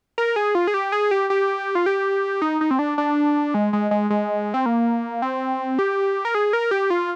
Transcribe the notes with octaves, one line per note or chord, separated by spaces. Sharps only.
A#4
G#4
F4
G#4
G4
G#4
G4
G4
F4
G4
D#4
D#4
C4
D4
D4
G#3
G#3
G#3
G#3
C4
A#3
C4
G4
A#4
G#4
A#4
G4
F4